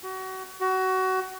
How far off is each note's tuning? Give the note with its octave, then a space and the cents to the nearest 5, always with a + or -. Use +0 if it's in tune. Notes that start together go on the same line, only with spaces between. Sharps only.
F#4 +30
F#4 +25